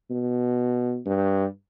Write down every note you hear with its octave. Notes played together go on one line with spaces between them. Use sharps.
B2
G2